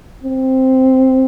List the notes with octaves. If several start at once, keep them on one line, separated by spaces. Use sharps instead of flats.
C4